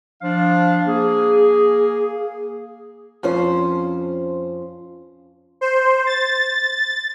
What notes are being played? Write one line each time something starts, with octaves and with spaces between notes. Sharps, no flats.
F3 D4 F5
A#3 G#4
F2 F3 C#4 C5
C5
A6